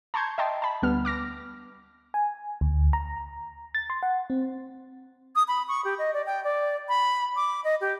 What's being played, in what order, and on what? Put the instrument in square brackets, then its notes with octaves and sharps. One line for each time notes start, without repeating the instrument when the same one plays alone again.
[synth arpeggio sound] A5 A#5 C6 C#6 G6 G#6
D#5 E5 G5 A5 C6
A5 B5
D2 G3 B3 F6
D6 F6 A#6
[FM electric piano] G#5
D2
A#5
A6
C6
F#5
C4
[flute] D#6
B5
C#6
G4
D#5
D5
G5
D5
B5
D6
D#5
G4